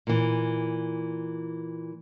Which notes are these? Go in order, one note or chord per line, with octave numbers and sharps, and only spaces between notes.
A#2 E3